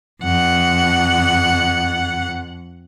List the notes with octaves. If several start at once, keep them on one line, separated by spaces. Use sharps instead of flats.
F2 F#5